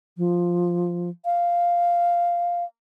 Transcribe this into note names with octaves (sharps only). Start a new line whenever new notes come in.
F3
F5